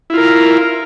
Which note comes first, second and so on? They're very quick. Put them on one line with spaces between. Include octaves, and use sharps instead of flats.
E4 F4 A#4